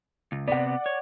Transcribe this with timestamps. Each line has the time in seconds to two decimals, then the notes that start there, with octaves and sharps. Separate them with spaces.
0.32 C#2
0.48 C3 B3 D5 F#5
0.86 C#5